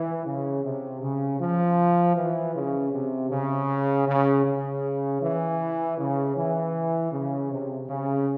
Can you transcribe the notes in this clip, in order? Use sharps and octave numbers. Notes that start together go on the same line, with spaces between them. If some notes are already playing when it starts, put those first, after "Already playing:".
Already playing: E3
C#3
C3
C#3
F3
E3
C#3
C3
C#3
C#3
C#3
E3
C#3
E3
C#3
C3
C#3